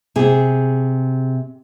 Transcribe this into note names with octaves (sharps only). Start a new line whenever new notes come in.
C3 G#4